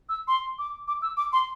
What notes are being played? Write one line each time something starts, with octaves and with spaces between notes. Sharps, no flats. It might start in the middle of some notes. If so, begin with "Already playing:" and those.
E6
C6
D6
D6
E6
D6
C6